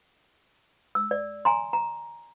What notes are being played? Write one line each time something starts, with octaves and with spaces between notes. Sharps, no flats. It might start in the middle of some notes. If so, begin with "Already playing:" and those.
E6
D5
G#5 A#5 C6
A#5